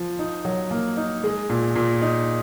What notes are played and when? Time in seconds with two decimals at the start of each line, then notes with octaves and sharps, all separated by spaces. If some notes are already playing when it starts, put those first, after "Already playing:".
Already playing: F3
0.19 D#4
0.45 F#3
0.71 A#3
0.97 D#4
1.24 G#3
1.50 A#2
1.76 A#2
2.02 D#4